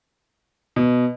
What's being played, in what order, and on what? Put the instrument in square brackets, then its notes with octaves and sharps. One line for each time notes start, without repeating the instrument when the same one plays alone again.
[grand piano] B2